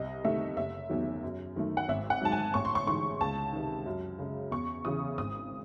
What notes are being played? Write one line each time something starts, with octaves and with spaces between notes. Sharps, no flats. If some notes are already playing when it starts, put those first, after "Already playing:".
Already playing: C2 D#5
C3 D#3 A3 E5
F#1 E5
E2 D#3 F#3
F#2
D#3 F#3 A3
F#5
G#1 E5
F#5
G#2 F#3 A5
G#5
A1 C#6
C6
C#6
G#2 E3 G#3 C#6
C#2 A5
C3 D#3
F#2
C#3 G#3
E2 C#6
C#3 E3 D#6
G#1 D#6